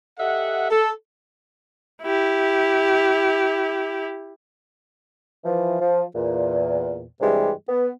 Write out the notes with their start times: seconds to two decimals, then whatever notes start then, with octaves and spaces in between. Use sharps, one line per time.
0.19 G4 A4 D#5 E5 F#5
0.70 A4
2.02 E4 G4
5.45 E3 F3
5.80 F3
6.15 E2 A#2
7.20 G2 C3 E3 G3 G#3
7.69 B3